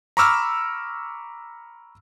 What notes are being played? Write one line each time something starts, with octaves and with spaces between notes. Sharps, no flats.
A#5 B5 C#6 D6 E6 F6